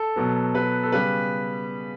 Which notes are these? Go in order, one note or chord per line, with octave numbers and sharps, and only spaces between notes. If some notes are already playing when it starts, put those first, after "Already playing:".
Already playing: A4
B2 F#3 B3
B4
A4
C#3 G3 B3 B4